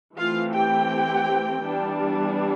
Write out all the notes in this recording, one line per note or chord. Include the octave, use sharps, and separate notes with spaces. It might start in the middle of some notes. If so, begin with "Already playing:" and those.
E3 A3 C4 F4 F5
G4 G5
E3 G3 B3 D4